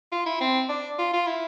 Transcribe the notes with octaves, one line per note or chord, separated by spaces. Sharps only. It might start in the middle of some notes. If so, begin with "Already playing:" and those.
F4
E4
C4
D4
F4
F4
E4